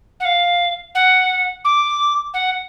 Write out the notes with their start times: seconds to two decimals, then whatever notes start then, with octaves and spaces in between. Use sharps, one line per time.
0.20 F#5
0.25 F5
0.95 F#5
1.65 D6
2.34 F#5